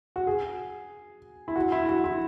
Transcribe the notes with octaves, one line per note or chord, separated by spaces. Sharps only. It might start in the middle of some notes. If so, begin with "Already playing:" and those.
F#4
G#4
E4
F#4
E4
F#4
E4